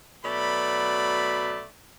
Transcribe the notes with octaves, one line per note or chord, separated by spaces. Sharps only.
B2 F#3 A3 D5 B5